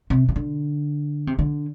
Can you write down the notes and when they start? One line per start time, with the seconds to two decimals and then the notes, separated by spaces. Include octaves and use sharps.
0.10 C3
0.29 C3
0.36 D3
1.27 C3
1.39 D3